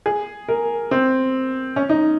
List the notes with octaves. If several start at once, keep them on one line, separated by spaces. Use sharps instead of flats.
G#4
A#4
C4
C#4
D#4